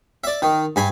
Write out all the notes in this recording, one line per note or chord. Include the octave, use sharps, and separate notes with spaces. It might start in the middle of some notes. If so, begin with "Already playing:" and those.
D5 E5
D#3
G2 G#5 B5